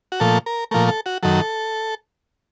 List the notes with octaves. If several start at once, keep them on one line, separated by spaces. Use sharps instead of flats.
F#4
A#2 F3 A3 A4
A#4
A#2 F3 A3 A#4
A4
F#4
F#2 D#3 F#3 A4